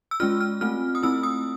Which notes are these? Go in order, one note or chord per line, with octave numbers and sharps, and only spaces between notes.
E6
G#3 C#4 F4 F6
F6
A3 C4 F4 F6
D#6
A3 C4 E4 E6
D#6